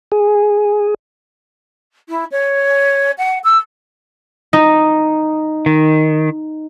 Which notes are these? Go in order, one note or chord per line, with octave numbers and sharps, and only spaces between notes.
G#4
E4
C#5
F#5
E6
D#4
D#3